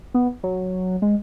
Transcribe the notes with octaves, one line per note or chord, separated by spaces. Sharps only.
B3
F#3
G#3